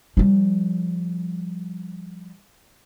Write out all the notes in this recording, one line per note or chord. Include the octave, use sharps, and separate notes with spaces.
F3 G3